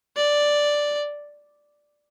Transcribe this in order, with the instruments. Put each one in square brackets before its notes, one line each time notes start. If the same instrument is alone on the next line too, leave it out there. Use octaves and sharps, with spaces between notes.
[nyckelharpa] D5